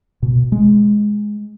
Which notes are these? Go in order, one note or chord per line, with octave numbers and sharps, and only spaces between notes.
B2
G#3